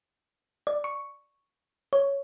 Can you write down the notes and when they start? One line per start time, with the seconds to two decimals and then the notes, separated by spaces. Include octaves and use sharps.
0.67 D5
0.84 C#6
1.93 C#5